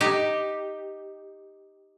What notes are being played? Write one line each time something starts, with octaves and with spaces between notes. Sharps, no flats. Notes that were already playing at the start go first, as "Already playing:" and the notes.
D#4 G4